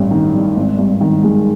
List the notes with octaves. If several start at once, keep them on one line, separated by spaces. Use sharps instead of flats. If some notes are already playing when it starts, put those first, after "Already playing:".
Already playing: A1 G2
D#3
G3
G#1
G2
D#3
G#3